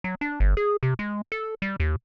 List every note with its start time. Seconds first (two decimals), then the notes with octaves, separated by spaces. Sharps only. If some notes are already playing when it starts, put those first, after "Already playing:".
0.04 F#3
0.21 D4
0.40 G1
0.57 G#4
0.83 C3
0.99 G#3
1.32 A4
1.62 G3
1.80 D#2